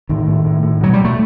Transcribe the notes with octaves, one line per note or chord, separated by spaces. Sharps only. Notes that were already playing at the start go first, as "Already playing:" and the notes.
A2 D#3
A2
A2
A2
B2 F#3
G3
B2 A3